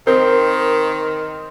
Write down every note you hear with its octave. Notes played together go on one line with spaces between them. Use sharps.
D#3 C4 A#4